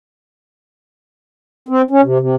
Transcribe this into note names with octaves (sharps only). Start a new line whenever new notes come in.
C4
C#4
C3
C3